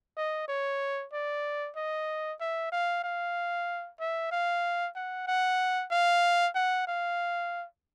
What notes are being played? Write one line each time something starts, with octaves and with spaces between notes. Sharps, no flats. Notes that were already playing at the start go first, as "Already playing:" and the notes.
D#5
C#5
D5
D#5
E5
F5
F5
E5
F5
F#5
F#5
F5
F#5
F5